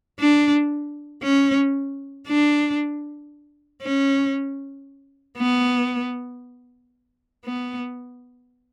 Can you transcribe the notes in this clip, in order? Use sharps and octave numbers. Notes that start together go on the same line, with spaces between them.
D4
C#4
D4
C#4
B3
B3